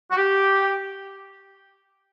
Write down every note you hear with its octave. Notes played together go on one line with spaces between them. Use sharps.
F#4
G4